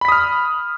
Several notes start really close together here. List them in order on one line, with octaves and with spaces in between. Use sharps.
B5 B6 D#6 F6